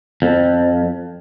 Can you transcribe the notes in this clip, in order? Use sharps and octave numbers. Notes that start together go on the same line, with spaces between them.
F2